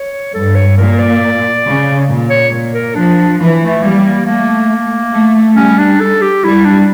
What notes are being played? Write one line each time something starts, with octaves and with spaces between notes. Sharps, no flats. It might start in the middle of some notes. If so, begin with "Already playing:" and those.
Already playing: C#5
G2 A4
C#5
A#2 A#4
D5
C#3
A#2
C#5
A#2
A#4
F3 D4
E3
A3
G3 A#3
A#3
A3 A#3
A3
G3 C#4
D4
A4
G4
G3 E4
D4